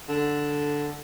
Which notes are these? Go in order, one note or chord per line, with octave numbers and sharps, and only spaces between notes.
D3